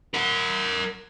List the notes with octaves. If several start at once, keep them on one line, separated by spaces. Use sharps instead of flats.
A#4 F#5